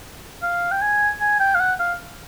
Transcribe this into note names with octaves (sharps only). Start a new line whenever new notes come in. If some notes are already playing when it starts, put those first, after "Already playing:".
F5
G5
G#5
G#5
G5
F5
F#5
F5